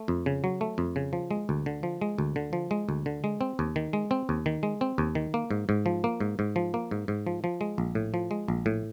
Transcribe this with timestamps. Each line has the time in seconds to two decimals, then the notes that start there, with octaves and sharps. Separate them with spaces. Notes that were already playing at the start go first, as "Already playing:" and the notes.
Already playing: A3
0.08 F2
0.26 C#3
0.44 F#3
0.61 A3
0.78 F2
0.96 C#3
1.13 F3
1.31 G#3
1.49 D2
1.66 D3
1.83 F3
2.01 G#3
2.18 D2
2.36 D3
2.53 F3
2.71 G#3
2.89 D2
3.06 D3
3.24 G#3
3.41 C4
3.59 D#2
3.76 D#3
3.93 G#3
4.11 C4
4.29 D#2
4.46 D#3
4.63 G#3
4.81 C4
4.98 D#2
5.15 D#3
5.34 A#3
5.51 G#2
5.69 G#2
5.86 F3
6.04 A#3
6.20 G#2
6.39 G#2
6.56 F3
6.74 A#3
6.91 G#2
7.08 G#2
7.27 F3
7.44 F3
7.61 G#3
7.78 A#1
7.95 A2
8.14 F3
8.31 G#3
8.48 A#1
8.66 A2